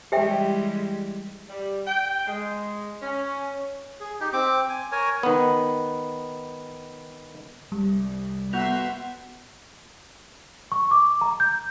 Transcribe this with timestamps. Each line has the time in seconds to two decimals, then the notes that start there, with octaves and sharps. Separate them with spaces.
0.12 E3 G3 G#3 G4 E5 G5
1.50 G3
1.85 G5
2.27 G#3
3.02 C#4
4.00 G#4
4.21 D#4 G4
4.33 C4 D6
4.69 G#5
4.92 A#4 C#5 G#5
5.23 D#3 B3
7.72 C2 G3
8.53 B3 F#4 B4 E5 C6 G6 F7
10.72 C#6
10.91 D6
11.21 A#5
11.40 G6